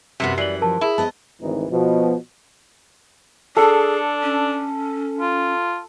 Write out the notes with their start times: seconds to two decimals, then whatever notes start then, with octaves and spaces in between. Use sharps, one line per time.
0.20 F#2 C3 G3 B3 F#4
0.38 E3 D5 C7 F#7
0.61 F3 A#4 A5
0.81 E4 G#4
0.98 B3 C5 D#5 A5
1.41 G#1 D2 E3 D#4
1.71 B2 F3
3.57 D4 G#4 A4
4.23 C#4
5.21 F4